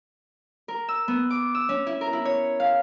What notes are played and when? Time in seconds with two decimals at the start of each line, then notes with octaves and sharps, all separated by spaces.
0.68 A#4
0.88 E6
1.08 B3
1.30 D6
1.55 E6
1.69 C#4
1.87 E4
2.01 A#4
2.13 E4
2.25 C#5
2.60 F5